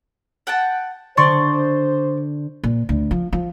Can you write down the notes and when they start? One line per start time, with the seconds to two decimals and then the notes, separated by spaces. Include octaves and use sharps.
0.47 F#5 G5 A5
1.17 D3 C5 D5 C6 C#6
2.64 A#2
2.89 D2
3.11 F3
3.33 F3